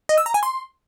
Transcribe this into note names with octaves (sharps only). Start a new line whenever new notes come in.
D#5
E6
A#5
G#5
C6